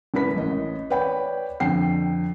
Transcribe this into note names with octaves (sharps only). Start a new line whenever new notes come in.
G#1 E4 A#4 B4 B5 B6
A1 D#5
B4 C#5 D5 G5 B5
F2 D3 G5 C7